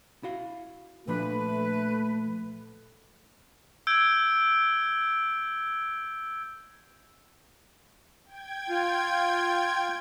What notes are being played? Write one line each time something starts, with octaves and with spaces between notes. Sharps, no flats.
E4 F#4 F5
A#2 F3 A3 D4 B4
E6 G6 G#6 D7 G7
G5 G#6
F4